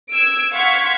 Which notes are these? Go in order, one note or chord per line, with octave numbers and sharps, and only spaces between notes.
E6 G#6 D7
F5 F#5 C6 C#6 G#6 B6